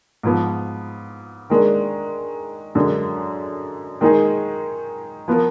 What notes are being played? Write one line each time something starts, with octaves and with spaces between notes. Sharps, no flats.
G#2 F3 B3
D#3 G#3 D4
F#2 D3 G#3
D#3 G#3 D#4 G#4
F3 B3 F4 A#4